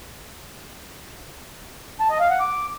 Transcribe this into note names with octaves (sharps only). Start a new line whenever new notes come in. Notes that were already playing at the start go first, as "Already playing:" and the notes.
A5
D#5
F5
F#5
D6